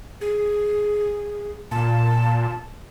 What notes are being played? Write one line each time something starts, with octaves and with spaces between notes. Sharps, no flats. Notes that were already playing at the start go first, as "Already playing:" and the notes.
G#4
A#2 A5